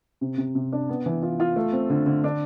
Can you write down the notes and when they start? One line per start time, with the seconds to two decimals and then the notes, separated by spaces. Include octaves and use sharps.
0.21 C3
0.38 C3
0.55 C3
0.72 D4
0.89 B3
1.06 E3
1.23 F4
1.40 F4
1.56 A3
1.73 C4
1.90 D3
2.06 D3
2.24 D4